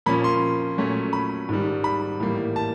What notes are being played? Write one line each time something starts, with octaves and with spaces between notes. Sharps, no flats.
A#2 F3 A#3 C#4 B5
C6
A#2 F#3 A3 C#4
B5
G#2 D#3 G3
B5
A2 E3 G3 A#3
A5